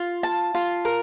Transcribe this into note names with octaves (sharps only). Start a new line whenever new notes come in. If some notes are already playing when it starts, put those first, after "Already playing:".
Already playing: F4 F5
A5
F4
A#4